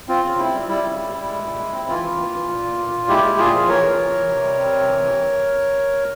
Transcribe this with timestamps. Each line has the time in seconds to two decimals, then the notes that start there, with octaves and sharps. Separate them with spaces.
0.09 C4 F4
0.24 C#3
0.39 C4 E4
0.54 G3
0.69 G3 E4
0.83 C#3
0.99 G3
1.14 G3
1.29 G#3
1.44 A#2
1.58 G#3
1.73 C4
1.88 E3 F4
2.04 E3
2.18 A#3
2.33 E3
2.49 A#2
2.64 A#3
2.78 A#2
2.94 A#2
3.09 G#3 E4 G4
3.23 G#3
3.38 A#2 F4 G#4
3.53 F3
3.68 E3 A#4 C#5
3.83 E3
3.98 E3
4.13 E3
4.29 C3
4.44 G3
4.59 C4
4.73 C3
4.88 E3
5.03 E3